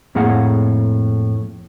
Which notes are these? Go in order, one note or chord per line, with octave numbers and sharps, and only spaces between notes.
F2 A2 A#3 G#4 F5 F#5